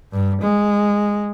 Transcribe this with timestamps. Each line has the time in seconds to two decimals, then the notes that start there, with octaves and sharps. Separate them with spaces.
0.13 G2
0.41 G#3